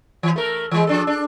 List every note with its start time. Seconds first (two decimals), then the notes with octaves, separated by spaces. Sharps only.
0.23 E3
0.36 A3 A#4
0.71 E3 G#3
0.87 F3 D4 A4
1.07 D4